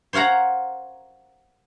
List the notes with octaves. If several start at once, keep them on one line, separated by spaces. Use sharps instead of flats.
C5 C#5 F5 F#5 A#5